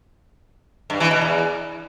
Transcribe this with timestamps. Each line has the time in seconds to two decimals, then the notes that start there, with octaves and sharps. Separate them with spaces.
0.90 G2
1.00 E3
1.11 B2
1.21 E2